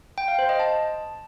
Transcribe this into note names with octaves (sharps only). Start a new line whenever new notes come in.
G5
F5
C5
D#5
A5